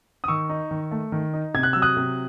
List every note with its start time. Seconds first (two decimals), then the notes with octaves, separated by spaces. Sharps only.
0.24 D#6
0.28 D#3 C#6 E6
0.50 D#4
0.71 D#3
0.91 A3
1.12 D#3
1.34 D#4
1.54 C3 G#6
1.63 F#6
1.73 F#3 E6
1.82 D#6 F#6
1.97 C3